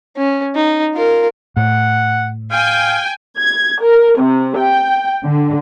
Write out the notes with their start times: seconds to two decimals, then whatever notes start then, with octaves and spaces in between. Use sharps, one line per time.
0.17 C#4
0.55 D#4
0.94 F4 A#4
1.57 A2 F#5
2.52 F5 G5 G#5
3.39 G#6
3.83 A#4
4.20 C3
4.58 G5
5.24 D3